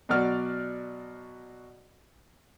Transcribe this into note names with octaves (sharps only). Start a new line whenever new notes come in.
B2 F#3 F#4 D5 F6